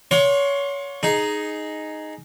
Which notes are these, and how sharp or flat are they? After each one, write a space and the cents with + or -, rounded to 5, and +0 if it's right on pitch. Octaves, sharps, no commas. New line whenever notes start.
C#5 +25 F#5 -45 C6 +25
D#4 +0 G#4 +10